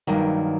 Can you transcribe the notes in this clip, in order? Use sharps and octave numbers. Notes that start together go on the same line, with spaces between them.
G2 D#3 F#3 A#3